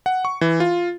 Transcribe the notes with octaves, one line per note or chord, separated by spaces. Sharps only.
F#5
C#6
E3
F4